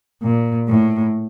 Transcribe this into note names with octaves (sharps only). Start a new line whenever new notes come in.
A#2
A2